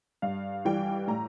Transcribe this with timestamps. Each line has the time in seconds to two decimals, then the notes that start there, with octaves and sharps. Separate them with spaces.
0.22 G2 F5
0.65 E3 G3 G5
1.08 A2 A#5